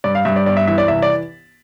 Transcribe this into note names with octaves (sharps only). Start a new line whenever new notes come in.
G2 D5
F5
G2 E5
D5
G1 D5
E5
E3 E5
D5
C2 E5
D5